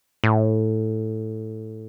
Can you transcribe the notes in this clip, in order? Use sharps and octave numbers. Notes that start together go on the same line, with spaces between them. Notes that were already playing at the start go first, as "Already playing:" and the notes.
A2